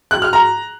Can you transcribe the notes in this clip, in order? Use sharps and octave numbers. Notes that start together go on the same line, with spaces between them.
F#6
F6
A#5